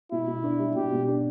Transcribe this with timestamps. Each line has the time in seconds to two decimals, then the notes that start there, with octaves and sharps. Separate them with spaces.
0.12 B2 E4
0.28 B2
0.44 D4
0.59 G3
0.75 B2 G4
0.92 B2
1.08 D4